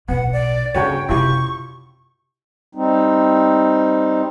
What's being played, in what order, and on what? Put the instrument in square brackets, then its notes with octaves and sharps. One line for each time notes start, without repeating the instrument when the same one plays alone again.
[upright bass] B1 A2 [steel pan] B3 [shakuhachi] F#5
[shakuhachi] D5
[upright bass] G2 A#3 [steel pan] C#3 F#4 C#5 [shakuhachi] G5
[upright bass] F#2 C3 [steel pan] E4 F4 G4 [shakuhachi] C#6
[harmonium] G3 C4 D#4